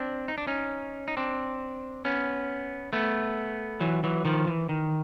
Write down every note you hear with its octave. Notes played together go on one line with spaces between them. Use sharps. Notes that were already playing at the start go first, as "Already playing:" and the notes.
Already playing: C4 D4
D#4
D4
C#4 D#4
D#4
C4 D4
B3 C#4
A3 B3
E3 F#3
E3 F#3
D#3 F3
E3
D#3